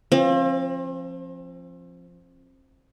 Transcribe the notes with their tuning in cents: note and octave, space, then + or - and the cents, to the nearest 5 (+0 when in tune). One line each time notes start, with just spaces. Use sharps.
F3 +0 C4 +40